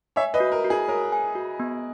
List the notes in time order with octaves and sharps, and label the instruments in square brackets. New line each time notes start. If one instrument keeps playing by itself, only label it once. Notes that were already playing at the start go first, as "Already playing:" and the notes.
[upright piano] C#5 E5 [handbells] G#5
[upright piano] B4 D#5
[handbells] F#4
[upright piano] A#4
[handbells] F#4
[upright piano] G#4
[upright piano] A#4 [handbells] C#5
[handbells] G#5
F#4
B3